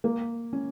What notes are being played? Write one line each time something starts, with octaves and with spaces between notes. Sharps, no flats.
A#3
C#4